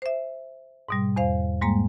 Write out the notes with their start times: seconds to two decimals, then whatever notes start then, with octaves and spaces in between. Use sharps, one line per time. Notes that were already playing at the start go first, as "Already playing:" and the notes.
0.02 C5 E5
0.89 G#2 B2 G3
1.16 E2 C5 F5
1.61 G#2 G3 G#3 A#3 A#5